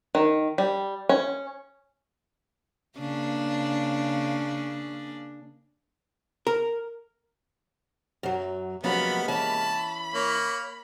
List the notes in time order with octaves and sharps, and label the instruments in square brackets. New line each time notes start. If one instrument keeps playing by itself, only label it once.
[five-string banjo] D#3
G3
C#4
[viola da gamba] C#3 A#3 D4
[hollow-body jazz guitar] A#4
[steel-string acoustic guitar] F#2 F#3
[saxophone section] C3 G#3 A#3 [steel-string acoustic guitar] F3 F#3 C#4 [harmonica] B3 [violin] B5
[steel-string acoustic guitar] E3 C#4 [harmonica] A5 [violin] B5
[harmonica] A#3 [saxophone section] C#5